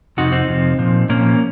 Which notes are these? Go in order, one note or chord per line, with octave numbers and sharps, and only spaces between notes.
F2 C3 F3 D#4 F#4
C4 D#4
F2 C3 F3
A#2 F3
A#2 F3 A#3 C#4